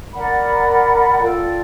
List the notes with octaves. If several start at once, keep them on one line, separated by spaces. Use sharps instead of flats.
A#4 D5 F#5 B5
F4 A4 D5 G5